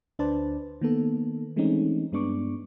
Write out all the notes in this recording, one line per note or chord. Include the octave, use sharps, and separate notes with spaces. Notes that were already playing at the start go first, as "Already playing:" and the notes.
D2 D4 B4 C5 D5 A5
D#3 A#3 B3 A4
E3 G#3 A3 C4 C#4 D#4
G2 G#3 B3 D4 C#6 D6